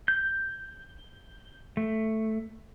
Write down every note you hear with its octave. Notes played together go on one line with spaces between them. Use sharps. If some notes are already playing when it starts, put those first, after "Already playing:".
G6
A3